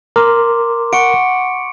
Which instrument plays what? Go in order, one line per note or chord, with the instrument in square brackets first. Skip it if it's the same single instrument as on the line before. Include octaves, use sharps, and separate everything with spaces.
[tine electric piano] A#4 [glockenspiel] C6 D6
[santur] F#5 [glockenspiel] C#6 C#7 D7